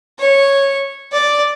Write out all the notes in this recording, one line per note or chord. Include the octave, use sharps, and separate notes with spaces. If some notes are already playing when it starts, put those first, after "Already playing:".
C#5
D5